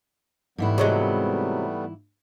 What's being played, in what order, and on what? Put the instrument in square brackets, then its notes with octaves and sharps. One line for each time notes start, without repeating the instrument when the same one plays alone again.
[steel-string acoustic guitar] G#2 E3 E4 [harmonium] G3 A3 B3
[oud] C3 F#3 G#3